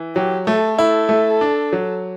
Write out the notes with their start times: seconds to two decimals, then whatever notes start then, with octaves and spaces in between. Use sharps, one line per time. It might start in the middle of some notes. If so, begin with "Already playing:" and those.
Already playing: E3
0.16 F#3 G4
0.47 A3 A4
0.78 E4 A4
1.09 A3
1.41 D4
1.73 F#3